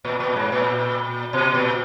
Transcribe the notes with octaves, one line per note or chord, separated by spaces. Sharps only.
A#2
A#2
G#2
A#2
B2
A#2